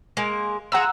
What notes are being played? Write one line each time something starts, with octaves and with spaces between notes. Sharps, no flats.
G#3 A#3
F4 G#4 F#5 A#5 E6